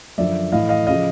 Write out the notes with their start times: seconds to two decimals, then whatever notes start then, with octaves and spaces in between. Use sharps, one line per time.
0.18 F#2 D3 F3 D5 E5
0.52 A2 E3 D#5 F5
0.69 D#5 F5
0.87 C#3 F3 D#5 F5